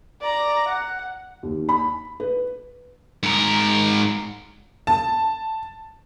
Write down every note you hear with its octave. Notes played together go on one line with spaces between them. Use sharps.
D5 A#5
F#5
D#2
B5
B4
G#2 A#4
A5